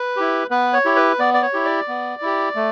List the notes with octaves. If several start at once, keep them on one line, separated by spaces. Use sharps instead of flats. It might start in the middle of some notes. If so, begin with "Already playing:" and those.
Already playing: B4
E4 G4
B3 B4
C#5
E4 G4
B4
B3 D5
D5
C#5
E4 G4
D5
B3
E4 G4
A3